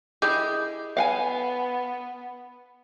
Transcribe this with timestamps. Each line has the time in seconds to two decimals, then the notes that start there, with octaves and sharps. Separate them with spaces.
0.22 E4 G4 G#4 D#5 D6 G6
0.97 B3 F5 F#5 G#5